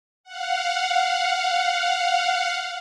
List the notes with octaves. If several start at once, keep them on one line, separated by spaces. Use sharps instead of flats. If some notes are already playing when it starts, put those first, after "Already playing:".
F5 F#5